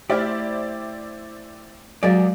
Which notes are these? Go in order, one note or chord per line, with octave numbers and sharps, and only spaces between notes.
A3 E4 G4 C5 D5 E5 F6
F#3 G#3 G4 G#4 A#4 D5 F5 A6